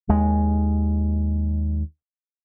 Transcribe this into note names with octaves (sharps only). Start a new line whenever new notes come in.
D#2 G#3